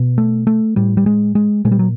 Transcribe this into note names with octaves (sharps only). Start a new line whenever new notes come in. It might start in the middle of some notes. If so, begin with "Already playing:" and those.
Already playing: B2
A3
A3
A2 G3
G3
G#3
G#3
A#2 G#3
G3
F#3